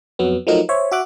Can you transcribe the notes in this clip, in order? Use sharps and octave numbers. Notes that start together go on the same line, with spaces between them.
F2 F#3 B3
F3 F#3 A3 D#4 A#4
C5 C#5 E5
F#4 E5 D6 F#6